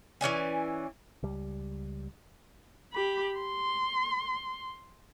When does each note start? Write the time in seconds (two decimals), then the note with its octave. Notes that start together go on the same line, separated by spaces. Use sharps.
0.21 E3 C#4 D5 G#5
1.23 C#2 G3
2.93 G4 B5
3.40 C6